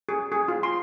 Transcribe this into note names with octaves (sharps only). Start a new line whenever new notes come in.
G#4
G#4
F4
C6